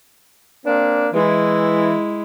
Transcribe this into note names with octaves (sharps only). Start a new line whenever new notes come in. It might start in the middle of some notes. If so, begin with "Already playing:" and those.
A#3 C4 D4
E3 G#3 E4